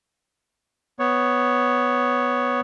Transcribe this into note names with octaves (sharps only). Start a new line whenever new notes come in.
B3 C#5